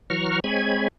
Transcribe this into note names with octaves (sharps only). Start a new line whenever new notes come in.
E3 F#3 F#5 A#5 C#6 F6
G#3 C4 C#5 G#5 B5 G#6